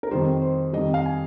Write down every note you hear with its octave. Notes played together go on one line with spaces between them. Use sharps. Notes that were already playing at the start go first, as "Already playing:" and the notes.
A#4
F2 D#3 G3 C5
C5
F2 D#3 G3 D#5
F5
G#5